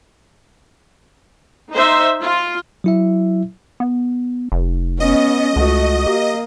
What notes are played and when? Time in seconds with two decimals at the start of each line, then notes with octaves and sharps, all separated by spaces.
1.72 D#4 C5 E5
2.21 F4
2.84 F#3 E4 E5
3.80 B3
4.52 F1
5.00 B3 C#4 D#5
5.56 C#2 A3 F#4
6.07 A#3 G4